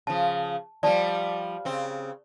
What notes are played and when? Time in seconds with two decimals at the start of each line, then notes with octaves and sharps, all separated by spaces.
0.07 C#3 F3 A5
0.83 F3 G3 D5 A5
1.65 C#3 C4